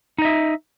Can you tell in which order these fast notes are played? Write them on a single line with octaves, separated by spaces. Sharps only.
D#4 D#5 E5